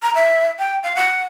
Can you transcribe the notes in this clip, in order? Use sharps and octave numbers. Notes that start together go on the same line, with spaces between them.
A#5
E5
G5
F5
F#5